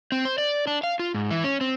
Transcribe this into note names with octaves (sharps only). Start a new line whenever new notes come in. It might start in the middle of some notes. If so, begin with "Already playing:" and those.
C4
C5
D5
D4
F5
F4
G#2
E3
C#4
C4